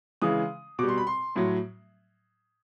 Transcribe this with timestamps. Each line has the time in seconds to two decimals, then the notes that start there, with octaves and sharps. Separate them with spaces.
0.22 C#3 E3 G#3 D#6
0.79 B2 D6
0.83 G3
0.88 C6
0.98 B5
1.07 C6
1.36 A2 F#3